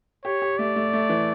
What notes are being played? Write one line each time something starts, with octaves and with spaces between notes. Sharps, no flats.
G4 C#5
G4
A3 D5
A3
A3
E3